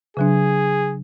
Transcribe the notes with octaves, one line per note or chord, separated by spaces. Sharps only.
C#3 F#3 D4 G#4